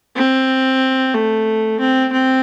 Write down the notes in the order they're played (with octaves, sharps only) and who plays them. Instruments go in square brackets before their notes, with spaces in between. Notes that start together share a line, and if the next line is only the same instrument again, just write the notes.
[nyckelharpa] C4
A3
C4
C4